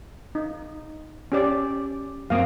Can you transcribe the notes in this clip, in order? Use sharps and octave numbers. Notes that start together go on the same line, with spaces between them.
D#4
C#4 G4 D5
F#2 A#3 C4 F5 D#6